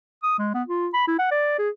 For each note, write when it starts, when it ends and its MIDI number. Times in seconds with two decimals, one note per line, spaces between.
0.23 0.37 87
0.38 0.52 56
0.54 0.63 59
0.68 0.88 65
0.94 1.04 83
1.07 1.18 64
1.19 1.27 78
1.31 1.55 74
1.58 1.70 68